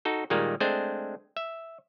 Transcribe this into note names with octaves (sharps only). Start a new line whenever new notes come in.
D#4 F#4 A4
A#2 D#3 G3 G#3 A#3
G#3 A3 C4 D4 C5
E5